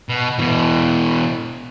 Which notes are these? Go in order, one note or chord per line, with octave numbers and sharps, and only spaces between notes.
B2
B2 E3